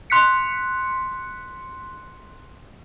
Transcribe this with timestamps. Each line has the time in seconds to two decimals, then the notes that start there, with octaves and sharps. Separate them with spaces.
0.10 C6 F#6 B6 C#7